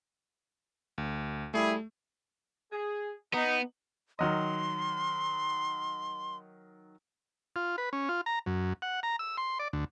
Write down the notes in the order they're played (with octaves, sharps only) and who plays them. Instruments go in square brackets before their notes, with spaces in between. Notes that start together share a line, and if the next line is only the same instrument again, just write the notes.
[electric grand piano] D2
[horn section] G3 E4 G#4 [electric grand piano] A3
[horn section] G#4
[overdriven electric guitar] B3 [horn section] D#4
[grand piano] D#3 F#3 D#5 [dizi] C6
[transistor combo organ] F4
B4
C#4
F4
A#5
F#2
F#5
A#5
E6
C6
D5
D2